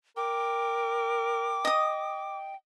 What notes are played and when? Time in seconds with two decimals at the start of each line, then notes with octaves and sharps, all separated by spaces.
0.17 A#4 G5 D6
1.65 D#5 D#6